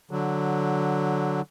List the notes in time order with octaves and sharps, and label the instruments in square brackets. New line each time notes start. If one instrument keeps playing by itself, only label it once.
[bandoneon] D3 F#3